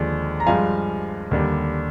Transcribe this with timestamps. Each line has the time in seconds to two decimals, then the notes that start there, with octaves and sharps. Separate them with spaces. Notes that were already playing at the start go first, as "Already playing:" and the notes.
Already playing: D#2 D3 F3 G#3
0.40 A#5
0.47 G2 F3 G#3 F5 G#5
1.31 D#2 D3 G3